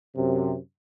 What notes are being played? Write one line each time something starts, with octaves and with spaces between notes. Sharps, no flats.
F#2 C3